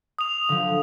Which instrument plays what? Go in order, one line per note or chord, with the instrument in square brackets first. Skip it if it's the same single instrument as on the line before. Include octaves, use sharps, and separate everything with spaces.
[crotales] D#6 F7
[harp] D3 F3